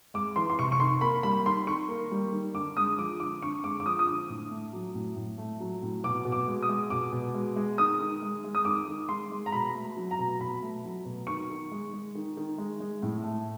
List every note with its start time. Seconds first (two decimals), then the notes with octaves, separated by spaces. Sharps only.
0.14 G#3 D6
0.36 E3 C6
0.50 C6
0.59 C3 C#6
0.72 C#6
0.79 D#3 C6
1.01 A#3 B5
1.23 G3 B5
1.46 D#3 C6
1.67 D#3 C#6
1.89 A#3
2.12 G3
2.32 D#3
2.54 D3 D6
2.77 G#3 D#6
2.98 F3 D6
3.20 D3 D6
3.42 D3 C#6
3.64 G#3 D6
3.80 D6
3.85 F3 D#6
3.99 D#6
4.07 D3 D6
4.29 A2
4.51 A3
4.73 F#3
4.94 A2
5.16 A2
5.38 A3
5.60 F#3
5.82 A2
6.04 B2 D6
6.25 B2
6.32 D6
6.48 G#3
6.62 D#6
6.69 G#3
6.90 B2 D6
7.12 B2
7.34 G#3
7.56 G#3
7.78 D#3 D#6
8.00 D#3
8.22 G#3
8.44 G#3
8.55 D#6
8.65 D#3 D6
8.88 D#3
9.09 G#3 C6
9.32 G#3
9.46 A#5
9.52 B2 B5
9.75 A3
9.97 F#3
10.11 A#5
10.19 B2
10.40 B2 B5
10.63 A3
10.84 F#3
11.05 B2
11.27 D#3 C#6
11.50 D#3
11.72 G#3
11.93 G#3
12.15 D#3
12.37 D#3
12.58 G#3
12.80 G#3
13.02 A2
13.24 A3